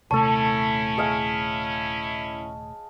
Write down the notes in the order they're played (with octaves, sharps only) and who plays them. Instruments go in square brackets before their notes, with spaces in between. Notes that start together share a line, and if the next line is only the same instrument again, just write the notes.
[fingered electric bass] D#1 C3 A3 [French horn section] C#4 E4 [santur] A4 C#5 [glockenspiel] A5
[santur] G#4 D#5 F5